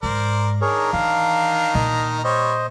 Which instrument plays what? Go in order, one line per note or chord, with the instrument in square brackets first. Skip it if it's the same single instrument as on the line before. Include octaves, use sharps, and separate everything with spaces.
[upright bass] G#2 [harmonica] A#4 C5 D5
[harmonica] D#3 D4 A#5 [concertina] G#4 A#4 C#5
[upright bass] E3 [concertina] F5
[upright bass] A#2 [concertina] D#5
[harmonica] G3 C#5 [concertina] C5 D#5